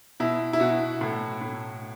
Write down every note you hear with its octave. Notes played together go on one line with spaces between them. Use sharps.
B2 E4
E4
B2 F#4
A2
A2